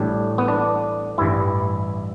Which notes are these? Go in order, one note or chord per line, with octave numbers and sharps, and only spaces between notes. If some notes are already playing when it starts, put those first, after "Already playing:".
Already playing: A1 A2 G3 D4
B3
D4
A1 G2 E3 G3 E4